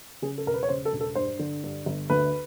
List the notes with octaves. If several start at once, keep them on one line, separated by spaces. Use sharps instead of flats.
C#3 G#4
A4
E1 A#4
B4
C#5
C#3 C5
A4
E1
A4
G2 C5
D3
G2
G1
D2 B4